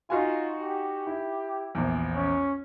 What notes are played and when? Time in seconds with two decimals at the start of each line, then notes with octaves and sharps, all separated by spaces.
0.10 D#4 F4 F#4 G#5
0.62 G4
1.07 E4
1.75 A#1 E2
2.15 C#4